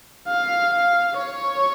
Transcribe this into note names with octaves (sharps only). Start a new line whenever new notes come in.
F5
F5
C#5